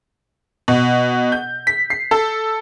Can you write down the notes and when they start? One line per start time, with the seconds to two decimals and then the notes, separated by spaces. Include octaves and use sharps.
0.68 B2
1.32 G6
1.67 B6
1.90 C7
2.11 A4